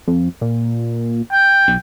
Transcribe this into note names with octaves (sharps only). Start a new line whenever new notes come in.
F2
A#2
G5
B1